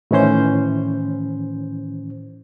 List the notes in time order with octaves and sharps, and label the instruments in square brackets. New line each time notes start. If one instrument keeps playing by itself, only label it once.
[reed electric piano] A2 D#3 E3 C#4 C5 G6